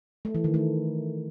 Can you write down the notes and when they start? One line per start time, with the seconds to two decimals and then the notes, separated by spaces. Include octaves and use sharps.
0.25 A3
0.35 E3
0.44 D#3
0.54 A3